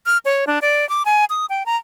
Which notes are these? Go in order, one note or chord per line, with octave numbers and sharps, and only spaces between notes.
F6
C#5
D4
D5
D6
G#5
D#6
G5
A#5